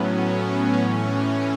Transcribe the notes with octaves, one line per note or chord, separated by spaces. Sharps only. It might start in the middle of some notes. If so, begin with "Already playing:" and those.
Already playing: A2 F#3 B3 C#4
A2 E3 C#4